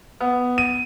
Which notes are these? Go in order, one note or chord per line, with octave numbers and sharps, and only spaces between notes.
B3
D#7